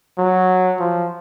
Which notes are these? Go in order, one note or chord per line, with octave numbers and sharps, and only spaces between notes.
F#3
F3